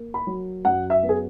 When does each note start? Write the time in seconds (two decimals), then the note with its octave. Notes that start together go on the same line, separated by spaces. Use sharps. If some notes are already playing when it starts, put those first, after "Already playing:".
Already playing: A#3
0.14 B5
0.27 F#3
0.65 F#2 F#5
0.90 E5
1.03 B3
1.09 G#4